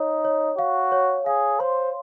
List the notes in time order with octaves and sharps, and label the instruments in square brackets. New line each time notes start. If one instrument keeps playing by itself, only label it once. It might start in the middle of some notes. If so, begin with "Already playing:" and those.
Already playing: [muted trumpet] D#4 [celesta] C#5
[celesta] C#5
[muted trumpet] F#4 [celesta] F5
[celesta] C#5
[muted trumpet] G#4 [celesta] F5
[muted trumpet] C5 [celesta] C6